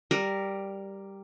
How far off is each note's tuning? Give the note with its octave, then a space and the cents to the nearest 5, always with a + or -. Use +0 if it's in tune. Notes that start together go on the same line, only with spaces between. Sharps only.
G3 +0 A#4 +0